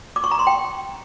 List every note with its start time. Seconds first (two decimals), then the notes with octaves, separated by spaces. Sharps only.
0.16 D6
0.24 C#6
0.31 A#5
0.39 C6
0.47 G5